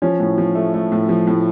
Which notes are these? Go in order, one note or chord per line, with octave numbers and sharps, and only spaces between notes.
F3 C#4
A2
F3
A3
A3
A2
F3
A2